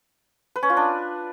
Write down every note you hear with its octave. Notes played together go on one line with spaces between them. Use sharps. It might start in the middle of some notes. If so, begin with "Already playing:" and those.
B4
C#4
F4
D4